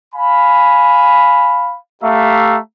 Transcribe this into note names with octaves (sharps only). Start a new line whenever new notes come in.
F5 G#5 B5
A3 G4 E5 F5 A#5